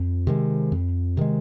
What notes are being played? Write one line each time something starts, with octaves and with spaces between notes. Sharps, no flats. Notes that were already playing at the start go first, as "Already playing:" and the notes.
Already playing: F2
C3 D#3 G#3
F2
C3 D#3 G#3